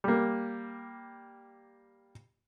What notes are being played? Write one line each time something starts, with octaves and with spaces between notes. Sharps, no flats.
G3 A#3